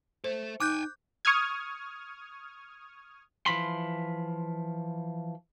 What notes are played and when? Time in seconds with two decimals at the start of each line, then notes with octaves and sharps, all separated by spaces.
0.24 A4 C5 E5
0.60 D#4 G5 G#5 D6 F#6 G6
1.25 C#6 D#6 F6 G#6
3.46 E3 F3 B5 C6